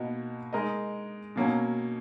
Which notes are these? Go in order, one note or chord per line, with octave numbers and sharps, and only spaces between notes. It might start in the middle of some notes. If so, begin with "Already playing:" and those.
Already playing: B2 A#3 D#4 F#4
G#3 D#4 A#4 D#5
B2 F#3 A#3 C#4